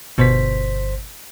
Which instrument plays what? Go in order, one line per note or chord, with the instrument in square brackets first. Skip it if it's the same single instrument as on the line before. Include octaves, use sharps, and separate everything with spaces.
[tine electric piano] G1 C5 B6 [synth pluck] B2